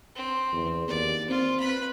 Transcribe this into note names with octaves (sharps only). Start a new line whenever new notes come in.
C4
E2
D#2 D5
C4 F4
B4 B5